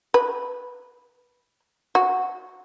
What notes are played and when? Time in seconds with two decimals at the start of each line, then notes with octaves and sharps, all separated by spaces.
0.14 B4
1.95 F#4